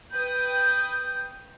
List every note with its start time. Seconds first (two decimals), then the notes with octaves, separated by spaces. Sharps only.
0.12 B4 G5 D#6 G6